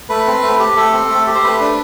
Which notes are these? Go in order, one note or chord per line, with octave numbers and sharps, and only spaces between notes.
A3 B4
C4
A3
G4
A3 A4
C4
A3
G4
C5
A3 B4
D4